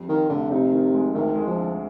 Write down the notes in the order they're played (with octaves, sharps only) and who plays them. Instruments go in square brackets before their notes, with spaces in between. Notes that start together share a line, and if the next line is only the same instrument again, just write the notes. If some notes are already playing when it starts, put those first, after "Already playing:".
Already playing: [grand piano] F2 G3
[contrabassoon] D#3 [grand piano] F3
[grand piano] F1 [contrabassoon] D3
[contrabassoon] C3 [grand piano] D#4
[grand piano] D#3
G#3
[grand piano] D2 [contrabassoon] D#3
[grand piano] G#3
[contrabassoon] F3
[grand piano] D3